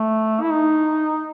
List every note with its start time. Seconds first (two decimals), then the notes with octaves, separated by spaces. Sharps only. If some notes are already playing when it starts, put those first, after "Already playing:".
Already playing: A3
0.41 E4
0.51 D#4